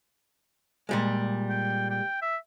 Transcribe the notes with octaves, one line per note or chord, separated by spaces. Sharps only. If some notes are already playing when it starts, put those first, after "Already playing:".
A#2 G3 G#3
G5
G5
E5